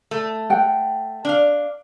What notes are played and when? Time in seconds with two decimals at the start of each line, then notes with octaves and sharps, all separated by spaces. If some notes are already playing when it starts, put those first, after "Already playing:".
0.11 A3
0.50 F#5 G5
1.25 D4 F5